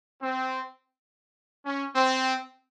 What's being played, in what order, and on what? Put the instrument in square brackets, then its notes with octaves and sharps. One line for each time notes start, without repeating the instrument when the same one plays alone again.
[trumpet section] C4
C#4
C4